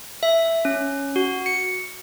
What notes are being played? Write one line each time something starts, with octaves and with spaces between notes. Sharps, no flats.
E5
C#4
F#4
C#7